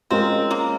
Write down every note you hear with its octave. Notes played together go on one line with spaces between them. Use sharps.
G#3 C4 C#4 F4 A#4 D#5
A#3